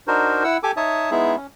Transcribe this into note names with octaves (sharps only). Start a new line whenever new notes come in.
D4 D#4 F#4 A#4 C5
E4 F#5 E6
G4 A4 G#5 D6
D#4 C#5 E5 A5 D#6
G#3 B3 D#4 E4 G#4 E5
C#4